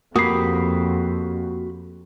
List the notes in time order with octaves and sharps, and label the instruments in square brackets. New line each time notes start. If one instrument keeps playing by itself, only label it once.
[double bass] F2 [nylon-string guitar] A#3 [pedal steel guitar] F#4 G4 B5 [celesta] D#6 C7